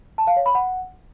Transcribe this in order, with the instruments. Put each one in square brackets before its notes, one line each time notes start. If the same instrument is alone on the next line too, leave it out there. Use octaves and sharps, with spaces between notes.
[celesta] A5
F5
C#5
B5
F#5